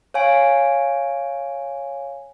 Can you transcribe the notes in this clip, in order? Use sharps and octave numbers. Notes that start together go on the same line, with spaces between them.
C#5 F5 G#5 D7